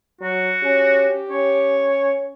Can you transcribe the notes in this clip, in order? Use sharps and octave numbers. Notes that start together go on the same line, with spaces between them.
F#3 F#4
C#4 G4
C#4 C#5